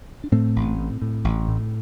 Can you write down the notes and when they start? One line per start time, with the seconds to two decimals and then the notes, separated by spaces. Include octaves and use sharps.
0.24 D4
0.32 A2 A3 C4
0.56 A1
0.78 A2
1.02 A2
1.24 A1
1.48 A2